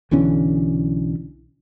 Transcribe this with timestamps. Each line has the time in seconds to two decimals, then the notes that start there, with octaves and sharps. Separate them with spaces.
0.11 B1 D3 E3 C#4